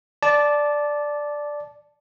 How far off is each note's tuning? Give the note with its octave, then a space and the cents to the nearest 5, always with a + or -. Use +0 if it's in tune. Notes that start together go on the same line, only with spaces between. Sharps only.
D5 +0 A5 -15